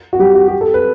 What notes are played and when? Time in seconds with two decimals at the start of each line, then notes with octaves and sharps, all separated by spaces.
0.13 F#4
0.19 G3 G4
0.35 F#4
0.48 G4
0.61 A4
0.74 B4